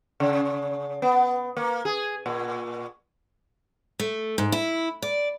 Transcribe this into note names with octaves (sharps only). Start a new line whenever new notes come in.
C#3
B3
A#3
G#4
A#2
A3
G#2
E4
D5